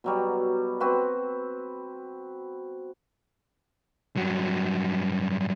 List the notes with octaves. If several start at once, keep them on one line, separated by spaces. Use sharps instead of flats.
B2 F#3 G3
C4 F#4 B4
G2 F#3